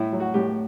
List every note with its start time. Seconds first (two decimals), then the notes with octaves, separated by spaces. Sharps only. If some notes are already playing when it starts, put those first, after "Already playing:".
Already playing: A2 E4
0.12 F#3
0.20 F#4
0.34 A2 G4